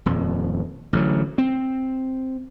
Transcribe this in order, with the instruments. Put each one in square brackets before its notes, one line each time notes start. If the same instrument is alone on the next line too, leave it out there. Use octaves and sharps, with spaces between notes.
[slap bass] D#1 F2
A1 D3 F#3
C4